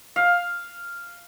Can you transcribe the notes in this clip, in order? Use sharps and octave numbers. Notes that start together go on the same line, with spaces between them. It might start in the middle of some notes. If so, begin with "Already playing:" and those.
F5